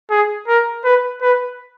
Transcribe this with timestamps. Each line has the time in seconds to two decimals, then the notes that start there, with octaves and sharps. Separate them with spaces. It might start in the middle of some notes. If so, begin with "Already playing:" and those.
0.10 G#4
0.47 A#4
0.84 B4
1.22 B4